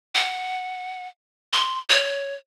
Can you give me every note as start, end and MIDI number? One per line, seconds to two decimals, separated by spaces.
0.15 1.07 78
1.53 1.79 84
1.90 2.35 73